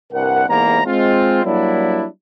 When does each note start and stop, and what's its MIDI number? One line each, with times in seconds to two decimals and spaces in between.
0.13 0.43 36
0.13 0.43 43
0.13 0.43 70
0.13 0.43 78
0.48 0.81 40
0.48 0.81 44
0.48 0.81 48
0.48 0.81 58
0.48 0.81 82
0.86 1.43 56
0.86 1.43 60
0.86 1.43 65
1.44 2.06 54
1.44 2.06 55
1.44 2.06 58
1.44 2.06 62
1.44 2.06 64